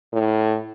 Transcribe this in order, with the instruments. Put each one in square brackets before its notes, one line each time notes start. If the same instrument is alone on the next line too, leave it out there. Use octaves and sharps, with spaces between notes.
[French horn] A2